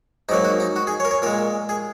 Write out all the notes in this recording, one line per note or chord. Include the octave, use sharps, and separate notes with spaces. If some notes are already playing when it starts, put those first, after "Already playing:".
G#2 F#3 A#3 D#4
F#4
D#4
F#4
G#4
C#5
A#4
C#5
A#2 G#3 A#4
G#4